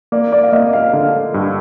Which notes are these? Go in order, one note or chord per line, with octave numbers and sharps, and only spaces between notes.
A#3 D5
D5
F5
A#3 D#5
F5
D3 F5
G2